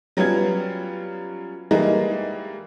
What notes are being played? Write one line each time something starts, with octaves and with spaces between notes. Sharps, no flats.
F#3 G3 B3 C#4 F4 G#6
E3 G3 G#3 A#3 D#4